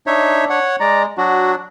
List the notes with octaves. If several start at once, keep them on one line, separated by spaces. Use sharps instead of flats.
D4 D#4 C#5 E5
C#5 F#5
G#3 D5 A#5
F#3 D4 F#4